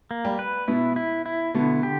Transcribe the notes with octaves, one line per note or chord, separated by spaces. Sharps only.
A#3
G3 G4
B4
B2 B3 E4
E4
E4
B2 D3 B3
G4